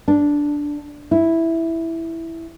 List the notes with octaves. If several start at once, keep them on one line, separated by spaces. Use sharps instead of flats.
D4
E4